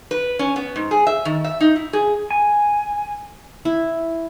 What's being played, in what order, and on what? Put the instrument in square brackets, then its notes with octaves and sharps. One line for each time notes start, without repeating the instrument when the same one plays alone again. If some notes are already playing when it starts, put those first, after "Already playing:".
[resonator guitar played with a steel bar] B4
C#4
B3
G#2
G#4
E5
D#3
E5
D#4
E4
G#4
[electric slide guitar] G#5
[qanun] E4